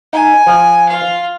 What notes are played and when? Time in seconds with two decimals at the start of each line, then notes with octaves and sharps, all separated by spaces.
0.13 D#4 G#5
0.47 F3
0.88 F4 F5